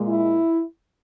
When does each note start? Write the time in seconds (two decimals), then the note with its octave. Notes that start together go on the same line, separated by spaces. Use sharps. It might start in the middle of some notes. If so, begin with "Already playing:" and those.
Already playing: A#2 G#3
0.08 E4